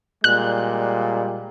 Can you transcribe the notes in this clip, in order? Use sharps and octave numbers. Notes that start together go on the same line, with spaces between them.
A#2 G3 G#3 F#6